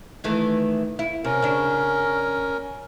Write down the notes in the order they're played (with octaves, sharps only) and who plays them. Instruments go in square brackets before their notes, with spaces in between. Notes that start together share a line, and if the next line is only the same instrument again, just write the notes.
[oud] D#3 E3 A3
E4
[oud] C3 [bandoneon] C#4 A#4
[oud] C#3 D4